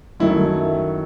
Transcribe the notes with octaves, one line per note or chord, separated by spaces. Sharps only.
F#2 D#3 F#3 A3 E4